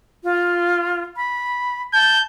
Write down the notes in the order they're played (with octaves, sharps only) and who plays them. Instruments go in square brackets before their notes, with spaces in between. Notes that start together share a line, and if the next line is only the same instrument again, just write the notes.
[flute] F4
B5
[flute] A5 [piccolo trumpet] G6